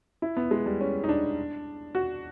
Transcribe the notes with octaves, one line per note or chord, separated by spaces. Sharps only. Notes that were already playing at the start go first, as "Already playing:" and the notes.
E4
B3
G#3
G3
C#4
D#4
D4
F#4